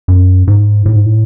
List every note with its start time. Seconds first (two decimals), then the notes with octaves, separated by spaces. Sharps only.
0.08 F#2
0.47 G#2
0.86 A2
0.96 G#2
1.06 A2